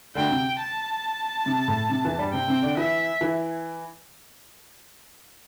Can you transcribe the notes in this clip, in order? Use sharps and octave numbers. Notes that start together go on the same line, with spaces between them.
D2 D3 G5
C3
A5
C3
A2
C3
E2 E3
G2 G3
C3 C4 G5
C3 C4
D3 D4
E3 E4 E5
E3 E4